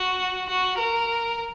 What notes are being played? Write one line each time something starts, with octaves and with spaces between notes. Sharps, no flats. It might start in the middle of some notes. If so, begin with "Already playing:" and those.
Already playing: F#4
F#4
A#4